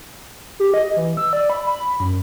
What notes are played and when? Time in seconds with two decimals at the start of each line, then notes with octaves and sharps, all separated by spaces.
0.60 G4
0.74 D#5
0.97 E3
1.17 E6
1.33 D5
1.50 B5
1.67 B5
2.00 F#2